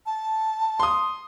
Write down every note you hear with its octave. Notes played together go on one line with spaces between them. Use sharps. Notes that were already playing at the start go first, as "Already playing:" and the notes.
A5
C6 D#6